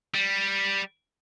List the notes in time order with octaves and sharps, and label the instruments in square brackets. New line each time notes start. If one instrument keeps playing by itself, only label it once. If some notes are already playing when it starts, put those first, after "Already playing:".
[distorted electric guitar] G3